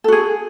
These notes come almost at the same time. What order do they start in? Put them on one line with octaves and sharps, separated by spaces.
A4 F#4 G#4